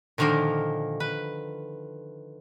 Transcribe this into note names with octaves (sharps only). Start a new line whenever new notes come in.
A#2 D3 D#3 F3 A#3
B4